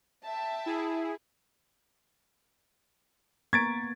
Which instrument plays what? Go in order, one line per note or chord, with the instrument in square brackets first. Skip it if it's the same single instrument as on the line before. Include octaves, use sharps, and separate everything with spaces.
[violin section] E5 G5 A5
[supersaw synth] E4 G#4
[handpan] A#3 B3 [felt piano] A#5 C#6 B6 [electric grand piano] G#6 A6 D7